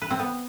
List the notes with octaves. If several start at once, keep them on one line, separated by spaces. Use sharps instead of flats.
B4
C4
B3